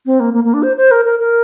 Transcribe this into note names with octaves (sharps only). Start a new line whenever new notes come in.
C4
A#3
A#3
A#3
D4
C5
C5
A#4
A#4
A#4